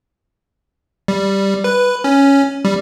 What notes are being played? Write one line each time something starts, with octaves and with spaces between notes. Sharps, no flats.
G3
B4
C#4
G3